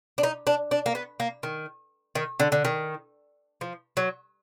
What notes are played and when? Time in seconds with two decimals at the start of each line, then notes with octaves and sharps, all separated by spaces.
0.18 D4
0.23 D#4
0.47 D4
0.71 D4
0.86 A#3
0.95 B3
1.20 A#3
1.43 D#3
2.15 D#3
2.40 D3
2.52 D3
2.65 D#3
3.61 F3
3.97 F#3